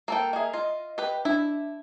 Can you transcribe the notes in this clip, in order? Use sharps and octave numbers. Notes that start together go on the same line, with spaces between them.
A#3 A4 G5
A#3 G#4 D#5 E5
F4 D#5
G4 B4
D4 E4 E5